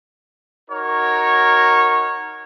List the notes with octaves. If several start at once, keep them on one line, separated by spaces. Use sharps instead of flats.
D#4 F#4 A#4 C#5